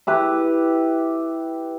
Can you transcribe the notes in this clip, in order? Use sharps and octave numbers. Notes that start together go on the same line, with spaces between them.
E4 G4 B4